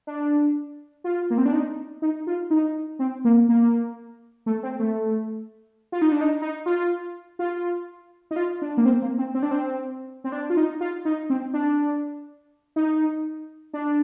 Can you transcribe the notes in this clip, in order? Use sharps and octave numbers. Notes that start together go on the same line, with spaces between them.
D4
F4
A#3
C4
D4
D#4
D#4
F4
D#4
C4
A#3
A#3
A3
C4
A3
F4
D#4
D4
D#4
D#4
F4
F4
D#4
F4
D4
A#3
C4
A#3
C4
C4
D4
C4
C4
D4
F4
D#4
F4
D#4
C4
D4
D#4
D4